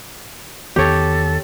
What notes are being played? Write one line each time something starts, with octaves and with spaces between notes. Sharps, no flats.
E2 D#3 B3 G4 A4 C#5